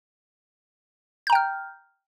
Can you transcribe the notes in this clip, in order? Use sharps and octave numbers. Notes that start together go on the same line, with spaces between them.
G5 A#5 F6 G6